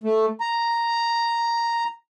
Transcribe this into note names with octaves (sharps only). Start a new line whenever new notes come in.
A3
A#5